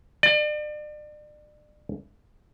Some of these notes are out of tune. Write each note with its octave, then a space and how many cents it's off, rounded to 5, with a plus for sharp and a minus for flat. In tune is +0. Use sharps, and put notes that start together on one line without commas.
D5 +35